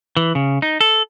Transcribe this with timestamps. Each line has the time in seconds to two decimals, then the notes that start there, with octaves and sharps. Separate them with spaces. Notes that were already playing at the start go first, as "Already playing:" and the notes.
0.17 E3
0.35 C#3
0.62 D#4
0.81 A4